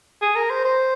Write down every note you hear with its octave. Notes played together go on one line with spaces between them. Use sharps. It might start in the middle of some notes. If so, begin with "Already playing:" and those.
G#4
A#4
C5
C5